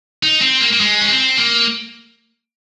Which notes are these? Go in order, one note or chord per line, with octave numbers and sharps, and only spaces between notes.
D#4
C4
A#3
A#3
G#3
C#4
C4
A#3